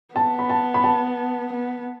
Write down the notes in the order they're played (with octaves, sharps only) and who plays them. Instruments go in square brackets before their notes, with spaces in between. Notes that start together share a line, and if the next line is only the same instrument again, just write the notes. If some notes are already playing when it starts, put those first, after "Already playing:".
[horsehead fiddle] B3 [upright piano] A5
[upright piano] B5
A5
B5
A5
[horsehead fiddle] B3